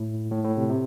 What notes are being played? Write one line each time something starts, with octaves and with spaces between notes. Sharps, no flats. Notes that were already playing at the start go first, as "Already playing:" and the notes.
Already playing: A2
A2
A2
C3
C3